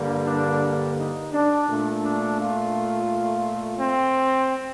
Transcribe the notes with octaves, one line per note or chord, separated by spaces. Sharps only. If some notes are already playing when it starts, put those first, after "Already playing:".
Already playing: G2 D3 G3 A#3
D4
D#4
D4
A#2 A3
D4
F4
C4